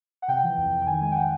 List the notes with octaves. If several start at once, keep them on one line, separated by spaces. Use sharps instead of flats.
F#5
C3 G5
E3
F2
F2
G5
D#3 G#5
G#3 G#5
G5
F#5